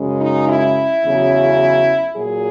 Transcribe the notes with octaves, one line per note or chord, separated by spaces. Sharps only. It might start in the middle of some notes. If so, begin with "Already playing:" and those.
Already playing: F#2 C#3 G#3
D#4
E4
E2 C#3 F#3
A#2 F#3 G#4